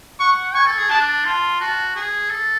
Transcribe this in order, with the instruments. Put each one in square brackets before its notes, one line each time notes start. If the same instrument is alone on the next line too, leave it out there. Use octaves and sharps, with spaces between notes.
[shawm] F#5 [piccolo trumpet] C#6
[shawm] G#5 [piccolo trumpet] C#6
[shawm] A4
G#4
[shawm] D4 [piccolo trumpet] A5
[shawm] F4 [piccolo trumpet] A5
[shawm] F#4 [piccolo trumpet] A5
[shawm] G#4
A4